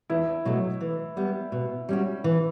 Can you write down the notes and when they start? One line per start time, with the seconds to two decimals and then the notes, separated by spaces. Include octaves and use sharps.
0.10 E2 E4
0.45 B2 F#3 A3
0.81 E3
1.17 G3 B3
1.52 B2
1.89 G3 C#4 F#4
2.24 E3